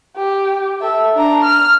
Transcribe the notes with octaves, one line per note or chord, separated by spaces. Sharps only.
G4
A4 E5
D4 A#5
F6